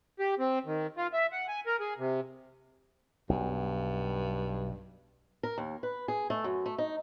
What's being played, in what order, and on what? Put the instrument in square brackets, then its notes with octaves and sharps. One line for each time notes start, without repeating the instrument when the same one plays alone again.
[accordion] G4
C4
D#3
F4
E5
F#5
G#5
A#4
G#4
C3
[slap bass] B1 [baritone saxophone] G2
[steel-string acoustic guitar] A#4
D#2
B4
G#4
A3
F#2
A3
D#4